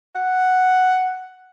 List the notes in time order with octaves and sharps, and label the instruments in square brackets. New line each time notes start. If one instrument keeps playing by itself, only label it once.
[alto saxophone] F#5